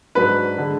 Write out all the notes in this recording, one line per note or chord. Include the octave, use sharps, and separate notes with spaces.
G#2 F#3 D4 B4 B5
D3 G#3